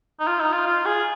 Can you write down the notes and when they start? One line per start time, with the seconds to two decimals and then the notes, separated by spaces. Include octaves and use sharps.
0.20 D#4
0.27 F4
0.40 D#4
0.53 F4
0.66 F4
0.86 G#4